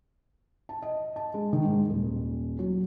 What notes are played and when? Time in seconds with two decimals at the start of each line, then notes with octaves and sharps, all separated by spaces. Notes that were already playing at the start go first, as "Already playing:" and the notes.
0.69 A5
0.82 D#5
1.16 A5
1.34 G#3
1.53 D#3
1.65 G#2
1.90 D#1
2.59 F#3